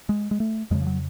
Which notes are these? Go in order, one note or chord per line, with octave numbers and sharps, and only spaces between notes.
G#3
G#3
A3
F2 C#3 G#3
F3
F#3